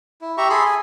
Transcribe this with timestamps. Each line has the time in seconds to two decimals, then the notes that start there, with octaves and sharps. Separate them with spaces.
0.21 E4
0.38 G4 E5 A#5 C#6
0.50 G#4 A4 B5 C6
0.66 G#5